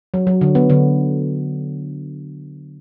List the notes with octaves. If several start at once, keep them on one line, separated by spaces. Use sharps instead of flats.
F#3
F#3
D3
B3
D3